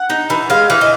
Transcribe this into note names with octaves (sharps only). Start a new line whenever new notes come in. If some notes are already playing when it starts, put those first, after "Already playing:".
Already playing: F#5
D#4
E3
G#3 F5
E3 F5
D#5